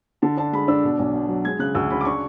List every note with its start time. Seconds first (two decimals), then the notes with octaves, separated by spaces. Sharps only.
0.22 D3 A5
0.37 D4 A5
0.53 G#3 B5
0.68 D4 E6
0.84 B2
0.99 B1
1.13 B2
1.29 F#3
1.45 G#3 G#6
1.59 C#3 F#6
1.75 D2 E6
1.90 C#3 B5
2.01 D6
2.05 D4 C#6